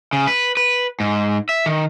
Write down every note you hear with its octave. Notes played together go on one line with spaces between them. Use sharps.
C#3
B4
B4
G#2
E5
D#3